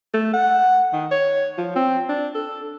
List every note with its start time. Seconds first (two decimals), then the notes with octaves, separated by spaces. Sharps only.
0.13 A3
0.33 F#5
0.93 D#3
1.11 C#5
1.58 F3
1.75 C4
2.09 D4
2.35 A4